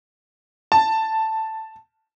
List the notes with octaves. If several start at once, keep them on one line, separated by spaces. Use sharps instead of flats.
A5